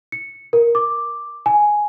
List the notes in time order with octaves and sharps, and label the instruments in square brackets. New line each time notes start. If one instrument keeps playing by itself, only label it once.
[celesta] C#7
A#4
D6
G#5